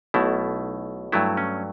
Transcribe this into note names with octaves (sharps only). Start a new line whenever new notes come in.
B1 B2 A3 E4
G2 F#3 A3 E4
C#4